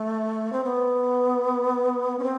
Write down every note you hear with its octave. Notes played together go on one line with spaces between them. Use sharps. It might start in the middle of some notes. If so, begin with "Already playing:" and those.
Already playing: A3
C4
B3
C#4
C4